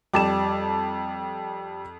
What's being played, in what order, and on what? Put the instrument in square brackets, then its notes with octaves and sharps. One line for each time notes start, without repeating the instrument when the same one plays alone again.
[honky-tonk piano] F2 D6 [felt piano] G3 A5 E7